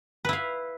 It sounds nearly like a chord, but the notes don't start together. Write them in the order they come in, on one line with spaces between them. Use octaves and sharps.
B4 E4 F5